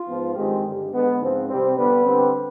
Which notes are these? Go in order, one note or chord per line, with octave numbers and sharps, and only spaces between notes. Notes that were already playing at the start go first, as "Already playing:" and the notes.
Already playing: F4
G#2 F3 B3
G2 D#3 G#3 C4 G4
G2 D3 G3
D3 G#3 B3
G#2 F3 C4
C3 G3 C4
D3 G3 B3 B4
D3 G3 C4